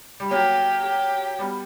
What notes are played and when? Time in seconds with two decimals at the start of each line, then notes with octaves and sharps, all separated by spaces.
0.20 G3
0.31 F#3 A#3 G4
0.84 G4
1.39 G3 B3